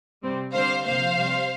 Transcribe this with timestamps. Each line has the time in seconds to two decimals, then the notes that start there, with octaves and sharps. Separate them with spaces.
0.23 C3 G3 C4
0.54 D3 G3 C4 C5 F5
0.85 C3 F3 A#3 C5 F5
1.17 C3 G3 C4